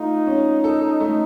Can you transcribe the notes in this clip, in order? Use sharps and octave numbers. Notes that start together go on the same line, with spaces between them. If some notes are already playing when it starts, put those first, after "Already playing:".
Already playing: A3 D#4 F4
C#4
A4
A3